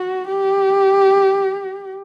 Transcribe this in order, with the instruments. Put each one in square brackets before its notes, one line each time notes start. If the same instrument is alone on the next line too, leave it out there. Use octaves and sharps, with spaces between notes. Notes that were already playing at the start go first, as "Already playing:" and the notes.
Already playing: [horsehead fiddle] F#4
G4